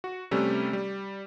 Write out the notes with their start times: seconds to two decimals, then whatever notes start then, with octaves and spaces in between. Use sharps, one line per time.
0.04 F#4
0.31 C3 G3 A3 C#4
0.73 G3